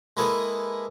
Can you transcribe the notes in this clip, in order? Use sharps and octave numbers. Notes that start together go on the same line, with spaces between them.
G#3 A#3 E4 G#4 A4 B4